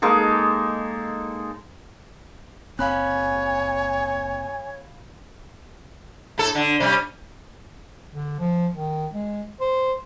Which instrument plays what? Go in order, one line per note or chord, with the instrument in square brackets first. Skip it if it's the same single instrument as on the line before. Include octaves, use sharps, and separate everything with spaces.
[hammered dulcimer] G#3 A#3 D#4 A4
[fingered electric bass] F#1 C4 [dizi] C#5 [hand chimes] F5 B5 F#6 [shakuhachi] G#5
[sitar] A2 A4
D3
C3 G3 C#4
[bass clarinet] D3
F3
D#3
G#3
C5